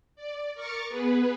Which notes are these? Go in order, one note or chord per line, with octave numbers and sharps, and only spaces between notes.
D5
A#4 C#6 D6 F6 A6 C#7
B3 G#4 B4